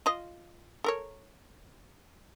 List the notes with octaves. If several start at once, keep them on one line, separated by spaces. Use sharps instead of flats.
F4 D#5
A4 A#4 C#5